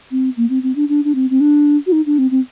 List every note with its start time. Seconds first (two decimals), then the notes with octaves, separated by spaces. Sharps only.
0.11 C4
0.37 A#3
0.50 C4
0.63 C4
0.76 D4
0.89 D4
1.04 D4
1.15 C4
1.30 C4
1.41 D4
1.87 F#4
1.92 D#4
2.06 D4
2.18 C4
2.31 C4